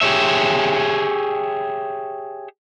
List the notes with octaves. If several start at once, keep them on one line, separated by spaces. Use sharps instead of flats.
G4 G#4 C#5 E5